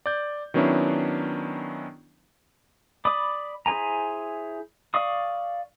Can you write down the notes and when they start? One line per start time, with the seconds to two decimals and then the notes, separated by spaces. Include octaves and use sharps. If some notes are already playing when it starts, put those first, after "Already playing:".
0.06 D5 G6
0.54 D#3 F#3 B3 C#4 D4 E4
3.05 D5 B5 D6 D#6
3.66 E4 G#4 C5 G#5 A#5
4.94 D5 F5 C#6 D#6